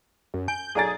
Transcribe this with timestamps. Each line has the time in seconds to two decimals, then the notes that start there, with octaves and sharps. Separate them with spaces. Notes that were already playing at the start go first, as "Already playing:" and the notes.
0.34 F#2
0.48 G#5 G6
0.75 B1 G#4 A4 D5 G#5 A#5 A6